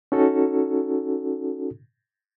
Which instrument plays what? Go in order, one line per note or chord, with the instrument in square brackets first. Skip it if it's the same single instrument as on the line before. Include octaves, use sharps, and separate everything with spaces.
[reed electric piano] C#4 D#4 F#4 A4